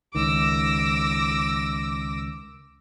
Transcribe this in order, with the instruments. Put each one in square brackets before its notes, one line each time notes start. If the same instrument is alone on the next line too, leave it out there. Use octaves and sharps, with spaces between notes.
[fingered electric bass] C#2 D#3 [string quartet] D6 E6 A#6